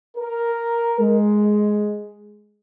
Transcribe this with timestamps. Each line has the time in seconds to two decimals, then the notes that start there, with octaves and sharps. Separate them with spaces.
0.17 A#4
0.99 G#3